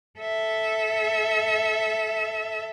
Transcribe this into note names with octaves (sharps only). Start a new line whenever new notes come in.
A4 E5